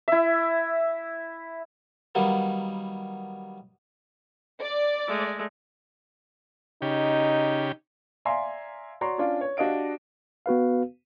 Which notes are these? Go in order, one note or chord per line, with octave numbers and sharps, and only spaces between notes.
E4 E5
D#3 F#3 G3 A#3 B3
D5
G#3 A3
C#3 D#4 G4
D5 E5 F5 G#5 A#5 C6
F#4 C#5 D5 A#5 C6 C#6
C#4 D4 F4 D5
C#5
D4 F#4 G4 D#5 F5 D7
B3 F#4 B4 F5